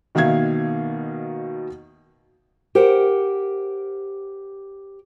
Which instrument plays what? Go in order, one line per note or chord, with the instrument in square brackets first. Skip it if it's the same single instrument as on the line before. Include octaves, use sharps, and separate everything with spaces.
[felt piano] B2 D#3 A#3 E5 F5 G#6
[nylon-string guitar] G4 A#4 C5 F#5